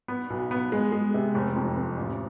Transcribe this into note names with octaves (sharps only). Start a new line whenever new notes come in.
B3
B1
B3
G#3
G#3
C3
F1
F2
F2
A1